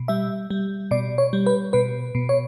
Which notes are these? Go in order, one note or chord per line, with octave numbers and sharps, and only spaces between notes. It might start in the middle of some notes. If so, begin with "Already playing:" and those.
Already playing: B2
G3 E5
G3
B2 D5
C#5
G3
B4
B2 B4
B2
C#5